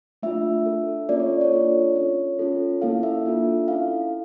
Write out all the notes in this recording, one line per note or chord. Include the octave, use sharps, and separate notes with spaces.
A3 D4 F4 E5
D4 A4
A#3 C#4 F4 A4 D5
C#5
C#5
D4 F4 A4
C#4 F4 A4 C#5
C#4 F4 A4
A#3 C#4 E4 A4 F5
E5
D4 F4 A4
C#4 E4 A4 F5